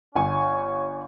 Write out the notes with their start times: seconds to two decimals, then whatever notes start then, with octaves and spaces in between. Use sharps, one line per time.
0.15 G1 C#4 C#5 G#5 C#6